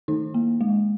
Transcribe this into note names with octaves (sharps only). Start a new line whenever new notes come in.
D#3 D#4
A#3
G#3